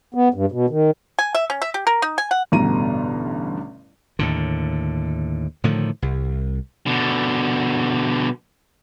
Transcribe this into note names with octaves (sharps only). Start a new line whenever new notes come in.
B3
G2
B2
D#3
G#5
E5
C#4
E5
G4
A#4
D#4
G#5
F#5
A1 G2 B2 D3 A#5 D#7
D#2 A2 D3
A2 D3 D#3 F3
C2
B2 D3